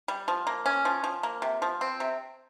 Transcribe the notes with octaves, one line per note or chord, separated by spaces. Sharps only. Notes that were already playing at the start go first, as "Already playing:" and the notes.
G3
F3
A#3
C#4
F3
F3
A#3
C3
F3
C4
C3